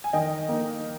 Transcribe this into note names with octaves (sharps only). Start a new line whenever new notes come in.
G#5
D#3 D#5 G5
A#3 D#4